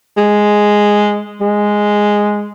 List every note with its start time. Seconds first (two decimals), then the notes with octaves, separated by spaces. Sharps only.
0.17 G#3
1.41 G#3